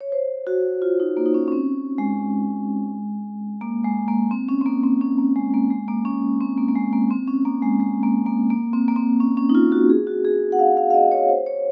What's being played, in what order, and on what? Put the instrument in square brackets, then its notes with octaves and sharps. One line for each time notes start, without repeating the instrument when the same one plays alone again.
[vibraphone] C#5
C5
F#4
F4
D#4
A#3
D#4
C#4
C#4
C4
G#3
A#3
G#3
A#3
C4
C#4
C4
A#3
C4
C#4
A#3
G#3
A#3
G#3
A#3
C#4
C4
A#3
A#3
G#3
A#3
C4
C#4
A#3
G#3
G#3
A#3
A#3
A#3
C4
A#3
C4
C#4
C#4
D#4
F4
F#4
G#4
F#4
G#4
F#5
F5
F5
F5
D#5
C#5
C5
C#5